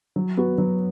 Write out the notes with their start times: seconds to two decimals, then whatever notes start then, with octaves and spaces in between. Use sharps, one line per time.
0.16 F#3
0.37 B3 F#4
0.58 F#3